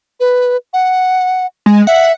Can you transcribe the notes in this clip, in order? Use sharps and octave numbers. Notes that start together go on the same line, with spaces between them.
B4
F#5
G#3
E5 F#5